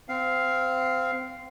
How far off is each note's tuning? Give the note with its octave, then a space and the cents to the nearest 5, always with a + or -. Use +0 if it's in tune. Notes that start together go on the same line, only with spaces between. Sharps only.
C4 -20 F5 +0